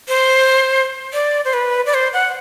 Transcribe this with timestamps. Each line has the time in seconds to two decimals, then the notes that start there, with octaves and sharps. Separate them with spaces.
0.08 C5
1.13 D5
1.45 C5
1.53 B4
1.86 D5
1.94 C5
2.13 F#5